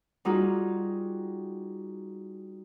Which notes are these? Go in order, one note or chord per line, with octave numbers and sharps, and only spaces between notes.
G3 D#4 F4 F#4 G#4